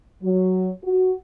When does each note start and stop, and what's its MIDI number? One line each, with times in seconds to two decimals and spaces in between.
0.22 0.70 54
0.83 1.12 66